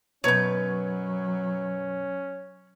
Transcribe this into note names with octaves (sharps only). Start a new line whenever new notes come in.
F#2 B2 F#3 C#4 B4 C#5 G6